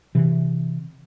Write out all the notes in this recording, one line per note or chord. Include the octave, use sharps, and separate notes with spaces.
C3 E3